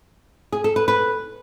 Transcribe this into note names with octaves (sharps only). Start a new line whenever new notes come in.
G#4
A4
B4
B4